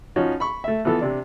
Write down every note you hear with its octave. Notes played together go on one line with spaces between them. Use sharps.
F3 C#4 D#4 F#4
B5 C#6
A3 E5
E3 F3 B3 A4
C3 D4